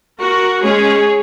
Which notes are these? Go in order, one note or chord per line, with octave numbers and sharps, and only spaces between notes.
F#4 A#4
G#3 C#4 G#4 C#5